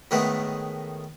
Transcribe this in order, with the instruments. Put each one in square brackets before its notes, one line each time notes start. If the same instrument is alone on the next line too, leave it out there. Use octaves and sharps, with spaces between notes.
[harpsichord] A2 D#3 G#3 A3 B3